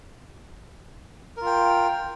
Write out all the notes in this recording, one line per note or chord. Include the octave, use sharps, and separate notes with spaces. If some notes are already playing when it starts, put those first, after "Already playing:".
F4 A#4 G5